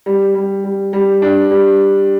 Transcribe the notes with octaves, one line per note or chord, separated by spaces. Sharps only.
G3
G3
G3
G3
D4
G3